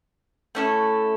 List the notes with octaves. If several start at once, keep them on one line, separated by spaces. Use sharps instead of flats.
A3 C#4 E4 A4